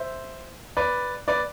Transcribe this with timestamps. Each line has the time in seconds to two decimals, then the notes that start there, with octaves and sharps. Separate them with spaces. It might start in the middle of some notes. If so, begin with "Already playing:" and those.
Already playing: C5 E5
0.77 B4 D5
1.28 B4 D5